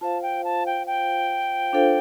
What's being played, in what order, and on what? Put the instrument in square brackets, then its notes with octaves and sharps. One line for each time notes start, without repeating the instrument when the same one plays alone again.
[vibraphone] F4 C5 F5 [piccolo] A5
[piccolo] G5
A5
G5
G5
[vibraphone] D4 F4 A4 C5 F5